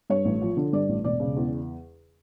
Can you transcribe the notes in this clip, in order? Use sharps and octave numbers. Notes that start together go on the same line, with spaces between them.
G2 C#5
A1
F3
D3
G2 D5
A1
E1 D5
C#3
E2